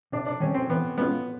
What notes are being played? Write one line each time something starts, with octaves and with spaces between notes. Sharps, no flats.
C3 D4
D4
D#3 G3 C4 C#4
C4
E3 B3
G#3 B3 C#4 F4